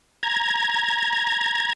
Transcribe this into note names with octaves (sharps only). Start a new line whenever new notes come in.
A#5 G#6